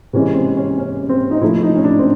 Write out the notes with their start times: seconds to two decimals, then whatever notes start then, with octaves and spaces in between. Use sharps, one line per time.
0.13 C3 E3 G#3 C#4
0.35 C4
0.57 C#4
0.78 C#4
1.09 C4
1.31 D#4
1.41 C3 F3 A3 E4
1.63 D#4
1.76 C#4
1.84 D4
1.99 C4